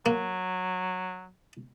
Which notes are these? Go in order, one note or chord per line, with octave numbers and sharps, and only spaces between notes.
F#3 A#3